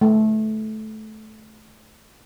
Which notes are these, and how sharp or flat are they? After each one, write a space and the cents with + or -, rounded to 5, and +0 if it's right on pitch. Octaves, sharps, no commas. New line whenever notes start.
A3 -20